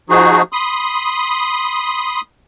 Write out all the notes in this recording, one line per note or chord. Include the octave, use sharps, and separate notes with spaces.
F3 D#4 F#4 G#4
B5 C6 D#6